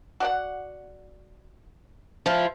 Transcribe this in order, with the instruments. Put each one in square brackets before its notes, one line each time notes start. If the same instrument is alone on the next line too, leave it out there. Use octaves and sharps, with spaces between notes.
[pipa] F#4 D5 F#5
[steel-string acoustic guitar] F3 E4 F4